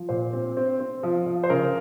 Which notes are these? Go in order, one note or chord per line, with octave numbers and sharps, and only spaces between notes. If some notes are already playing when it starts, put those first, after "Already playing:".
Already playing: F3
A#2 C5
C4
C4
C4
F3
F3
C5
C#3 A#4